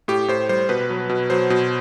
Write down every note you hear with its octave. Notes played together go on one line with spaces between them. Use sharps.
A2 G4
A2 C5
G3 C5
B2 B4
F#3
B2
F#3 C5
B2